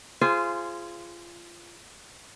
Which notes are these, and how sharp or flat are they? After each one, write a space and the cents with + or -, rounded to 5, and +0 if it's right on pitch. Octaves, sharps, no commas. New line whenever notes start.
F4 -20 G#4 +0 C5 +0